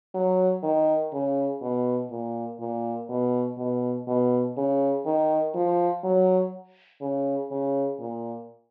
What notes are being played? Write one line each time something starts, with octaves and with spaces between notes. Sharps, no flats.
F#3
D#3
C#3
B2
A#2
A#2
B2
B2
B2
C#3
D#3
F3
F#3
C#3
C#3
A#2